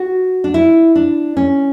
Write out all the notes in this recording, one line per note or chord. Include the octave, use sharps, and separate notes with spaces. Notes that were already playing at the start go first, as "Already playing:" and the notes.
Already playing: F#4
D4
E4
D4
C#4